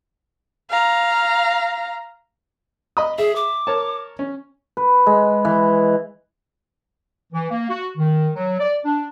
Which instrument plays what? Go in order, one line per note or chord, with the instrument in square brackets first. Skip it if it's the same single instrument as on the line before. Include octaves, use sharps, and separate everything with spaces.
[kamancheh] F5 A#5
[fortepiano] D#5 B5 D#6
[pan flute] G#4 [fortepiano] E5
[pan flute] D6
[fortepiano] A#4 C#5 A5
C#4
[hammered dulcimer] B4
G#3
E3
[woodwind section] E3
A#3
F#4
D#3
F#3
D5
D4